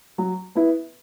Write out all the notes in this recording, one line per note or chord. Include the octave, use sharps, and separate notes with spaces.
F#3
B3 E4